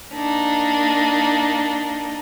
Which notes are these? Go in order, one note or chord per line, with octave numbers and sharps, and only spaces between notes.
A#3 D4 D#4